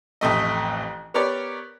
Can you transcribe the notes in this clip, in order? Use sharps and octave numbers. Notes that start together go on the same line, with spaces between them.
A1 F2 A3 D#5
B3 G4 A#4 C#5 D5